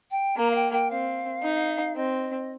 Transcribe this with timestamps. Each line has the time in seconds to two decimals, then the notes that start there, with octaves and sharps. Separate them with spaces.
0.11 G5
0.36 A#3 A#5
0.51 F5
0.55 G5
0.72 G5
0.90 C4 F5
1.43 D#4
1.96 C4 D#5